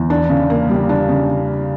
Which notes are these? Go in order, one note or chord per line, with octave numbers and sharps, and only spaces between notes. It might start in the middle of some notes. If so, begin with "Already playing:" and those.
Already playing: E2
D4
C#3
A#3
G3
D4
C#3